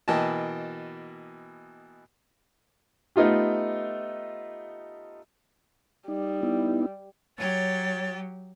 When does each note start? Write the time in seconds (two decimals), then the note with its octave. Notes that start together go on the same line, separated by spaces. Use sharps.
0.08 B2 E3 A#3 D#5 G5 A5
3.16 A3 B3 D#4 F4 G4
6.08 G3 D#4
6.43 B3 D#4 E4
7.38 F#3 G4 C#5 A6